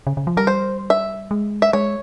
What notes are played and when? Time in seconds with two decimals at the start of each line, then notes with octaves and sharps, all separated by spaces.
0.07 C#3
0.17 C#3
0.27 F3
0.37 G3 A#4
0.47 C5
0.90 E5
1.31 G#3
1.62 E5
1.73 G#3 C#5